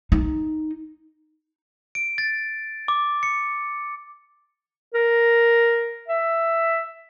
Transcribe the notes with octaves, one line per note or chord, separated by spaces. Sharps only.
D#4
D7
A6
D6
C#7
A#4
E5